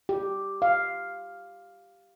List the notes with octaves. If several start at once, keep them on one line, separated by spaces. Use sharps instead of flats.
G4
F5